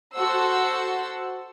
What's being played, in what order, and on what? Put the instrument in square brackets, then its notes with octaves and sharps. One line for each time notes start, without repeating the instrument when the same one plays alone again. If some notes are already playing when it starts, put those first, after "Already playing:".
[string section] F#4 A4 C5 F#5 C6 E6